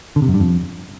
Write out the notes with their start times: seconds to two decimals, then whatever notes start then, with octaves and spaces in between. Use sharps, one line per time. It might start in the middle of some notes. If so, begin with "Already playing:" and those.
0.16 D3
0.22 C3
0.28 F#2
0.34 G2
0.40 F2